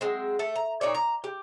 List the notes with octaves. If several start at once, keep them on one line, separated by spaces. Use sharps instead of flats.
F#3 G#3 C4
A3 A4
A#5
A#2 D#4 C#5 D5
A#5
G4